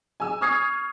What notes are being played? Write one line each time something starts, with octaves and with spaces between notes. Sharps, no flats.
G#5 E6
C#6 D#6 F6 G#6 C7